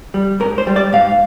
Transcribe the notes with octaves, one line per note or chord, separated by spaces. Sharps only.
G3
G#2 A#4
C5
G3
D5
G#2 F5